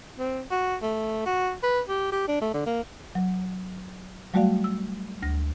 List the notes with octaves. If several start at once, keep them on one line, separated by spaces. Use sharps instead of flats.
C4
F#4
A3
F#4
B4
G4
G4
D4
A3
D3
A#3
F#3
F#3 G3 A3 F#4 D5 F5
E6
D2 A#6